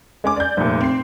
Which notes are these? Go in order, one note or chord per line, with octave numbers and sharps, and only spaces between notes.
G#3 C#4 D6
D5 G6
F1 A#2
C4 C7